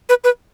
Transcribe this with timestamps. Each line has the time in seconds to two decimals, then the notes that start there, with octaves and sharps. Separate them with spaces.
0.09 B4
0.24 B4